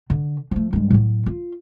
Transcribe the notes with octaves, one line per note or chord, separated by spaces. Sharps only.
D3
F3 A3
G2 G#3
A2 F#3
F4